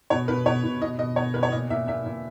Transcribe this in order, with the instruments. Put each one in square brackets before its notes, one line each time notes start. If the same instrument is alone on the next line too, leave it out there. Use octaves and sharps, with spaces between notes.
[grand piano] B2 C#5
B2 B4
B2 C#5
B2
B2 D#5
B2 D#5
B2 C#5
B2 B4
C#5
A#2 D#5
A#2 E5
A#2 E5
A#2